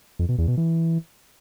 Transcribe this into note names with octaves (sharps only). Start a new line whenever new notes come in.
F2
B2
E2
B2
E3